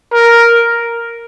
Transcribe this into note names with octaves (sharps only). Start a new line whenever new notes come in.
A#4